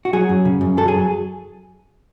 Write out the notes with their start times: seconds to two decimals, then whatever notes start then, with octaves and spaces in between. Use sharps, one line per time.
0.05 F#4
0.13 F#3 G#4
0.29 F#2
0.45 C#3
0.61 F#2
0.77 F#3 A4
0.88 G#4